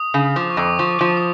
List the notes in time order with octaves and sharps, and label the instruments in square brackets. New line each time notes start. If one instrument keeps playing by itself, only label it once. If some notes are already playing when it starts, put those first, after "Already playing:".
Already playing: [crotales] D#6
[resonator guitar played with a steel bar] C#3
[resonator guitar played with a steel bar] F3 [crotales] D6
[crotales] C#6
[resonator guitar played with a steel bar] F2 [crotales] D#6
[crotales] D6
[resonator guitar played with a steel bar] F3 [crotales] C#6
[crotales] D6
[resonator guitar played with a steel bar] F3
[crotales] D#6